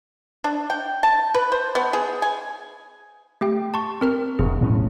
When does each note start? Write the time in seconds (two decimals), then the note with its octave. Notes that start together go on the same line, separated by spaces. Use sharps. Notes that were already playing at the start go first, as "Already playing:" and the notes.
0.44 D4
0.70 G5
1.03 A5
1.34 B4
1.52 C5
1.75 B3
1.93 G#4
2.22 G#5
3.41 A3 G4 G5
3.74 A5 C6 C#6
4.01 C4 A#4 F6
4.39 E1 G#4
4.61 B1 A2 C#4